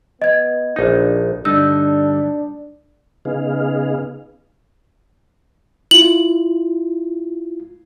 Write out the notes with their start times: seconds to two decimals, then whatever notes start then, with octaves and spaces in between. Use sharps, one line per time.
0.22 B3 D#5 G#6
0.76 A#1 D4 D#4
1.45 G2 D3 G3 D4 D#4 E6
3.25 C#3 B3 D#4 G#4 F5
5.91 E4 F4 F#7